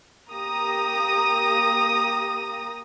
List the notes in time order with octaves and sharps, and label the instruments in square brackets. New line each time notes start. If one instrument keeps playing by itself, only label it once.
[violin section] A#3 G4 A#5 D#6 A#6